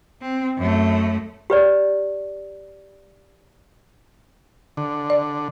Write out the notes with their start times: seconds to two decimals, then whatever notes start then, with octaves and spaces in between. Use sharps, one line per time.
0.21 C4
0.58 F#2 A3
1.50 G4 B4 D5
4.77 D3
5.10 D5